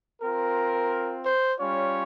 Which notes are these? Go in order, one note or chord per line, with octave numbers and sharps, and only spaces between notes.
C4 F4 A#4
C5
G3 C#4 F4 C#5